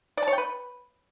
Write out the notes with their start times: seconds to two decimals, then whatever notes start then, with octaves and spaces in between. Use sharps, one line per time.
0.17 D5
0.23 A5
0.28 C#5
0.33 G5
0.38 B4